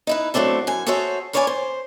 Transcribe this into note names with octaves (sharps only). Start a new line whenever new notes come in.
D#4 E4 B4
F#3 A3 C4 D4 A4
F#2 G#5
F#4 G#4 A4 C5 C#5 E5
A#4 B4 C#5 D5 E5 G#5
C5